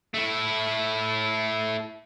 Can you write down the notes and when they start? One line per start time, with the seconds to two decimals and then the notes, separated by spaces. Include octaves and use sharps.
0.14 A3 E4